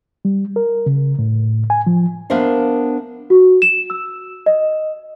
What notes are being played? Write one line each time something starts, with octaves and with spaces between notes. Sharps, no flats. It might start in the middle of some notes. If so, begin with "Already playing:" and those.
G3
A#4
C#3
A2
G#5
F3
B3 D4 A#4 C5 E5 F5
F#4
E7
E6
D#5